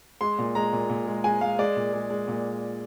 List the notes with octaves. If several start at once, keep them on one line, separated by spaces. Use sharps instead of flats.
G#3 C6
A#2
G#3 A#5
A#2
A#2
G#3
G#3 G#5
G#3 F5
G#3 D5
A#2
G#3
G#3
A#2